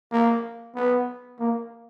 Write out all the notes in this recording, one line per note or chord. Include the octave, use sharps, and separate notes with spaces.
A#3
B3
A#3